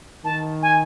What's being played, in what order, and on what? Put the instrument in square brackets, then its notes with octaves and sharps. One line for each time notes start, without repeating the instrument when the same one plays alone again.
[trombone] D#3 [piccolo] A5
[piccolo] G#5